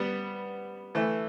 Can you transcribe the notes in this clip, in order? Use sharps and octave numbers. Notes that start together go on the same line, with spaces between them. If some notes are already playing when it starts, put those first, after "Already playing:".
Already playing: G3 B3
E3 A3